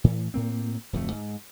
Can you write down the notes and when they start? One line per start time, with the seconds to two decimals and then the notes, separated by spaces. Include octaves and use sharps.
0.04 A2 E3
0.34 A2 A#3 C4
0.93 D1 F2 F3 A3
1.12 G#2